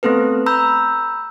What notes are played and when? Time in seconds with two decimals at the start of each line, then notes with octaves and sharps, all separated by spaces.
0.03 A3 B3 C4 A4 B4
0.46 A#5 B5 E6 G6